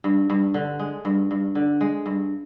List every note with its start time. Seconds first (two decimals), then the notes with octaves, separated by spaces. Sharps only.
0.04 G2
0.30 G2
0.54 D3
0.79 G#3
1.05 G2
1.31 G2
1.55 D3
1.81 G#3
2.06 G2